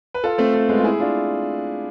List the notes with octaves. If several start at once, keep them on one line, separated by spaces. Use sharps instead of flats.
B4
F4 A4
A3 C4
A3
G#3 B3
F4
E4 G#4
D4 F4